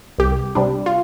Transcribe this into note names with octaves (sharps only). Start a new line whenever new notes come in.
C2 G4
C3 G3 D4
F4